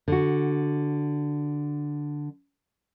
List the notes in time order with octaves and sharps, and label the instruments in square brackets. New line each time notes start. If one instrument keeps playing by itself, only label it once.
[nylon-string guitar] D3 F#4